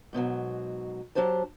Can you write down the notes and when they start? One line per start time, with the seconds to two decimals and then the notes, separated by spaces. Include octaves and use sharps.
0.13 G#2 B2 D#3 F#3
1.15 F#3 D4 G4 C5 A5